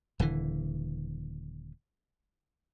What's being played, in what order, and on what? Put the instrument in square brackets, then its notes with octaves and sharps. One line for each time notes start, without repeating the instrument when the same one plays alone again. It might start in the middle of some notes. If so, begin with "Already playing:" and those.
[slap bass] D#1 D3 E3